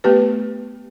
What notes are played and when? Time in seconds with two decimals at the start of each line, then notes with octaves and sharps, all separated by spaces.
0.04 A3 B3 G4 B4